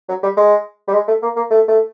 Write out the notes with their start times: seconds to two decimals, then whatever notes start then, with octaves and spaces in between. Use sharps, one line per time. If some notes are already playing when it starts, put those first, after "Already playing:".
0.08 F#3
0.23 G3
0.37 G#3
0.88 G3
0.93 G#3
1.08 A3
1.22 A#3
1.36 A#3
1.51 A3
1.68 A3